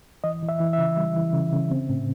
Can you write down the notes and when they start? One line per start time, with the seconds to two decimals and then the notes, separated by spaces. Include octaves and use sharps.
0.24 E3 D#5
0.43 E3
0.49 E5
0.60 E3
0.73 E5
0.78 C#3
0.97 G3
1.16 E3
1.34 C#3
1.53 C#3
1.71 C4
1.89 A2